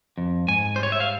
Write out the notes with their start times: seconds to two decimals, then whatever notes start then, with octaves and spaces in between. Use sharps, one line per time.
0.18 F2
0.48 G#2 G#5
0.76 G3 C5
0.83 C#5
0.92 E5
1.00 F5